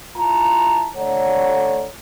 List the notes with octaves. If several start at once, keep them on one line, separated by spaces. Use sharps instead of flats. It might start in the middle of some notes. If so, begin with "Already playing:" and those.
E4 F4 A5 A#5
D3 A3 C#5 D5 F#5 A#5